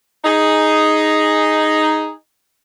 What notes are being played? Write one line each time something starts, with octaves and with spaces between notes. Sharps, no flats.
D#4 G#4